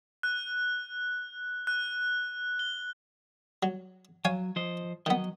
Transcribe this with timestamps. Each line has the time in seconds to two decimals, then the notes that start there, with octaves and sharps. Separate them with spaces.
0.23 F#6
1.67 F#6
2.59 G7
3.63 F#3
4.25 F#3 C#5 F5 G#5
4.56 F3 C5 D#5
5.06 D#3 F#3 B3 D#5